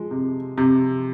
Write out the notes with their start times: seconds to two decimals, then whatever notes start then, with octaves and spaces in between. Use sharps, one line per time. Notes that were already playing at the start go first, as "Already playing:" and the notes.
Already playing: F3 G#3
0.11 C3
0.58 C3